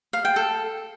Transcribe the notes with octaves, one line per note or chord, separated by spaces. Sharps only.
F5
G5
A4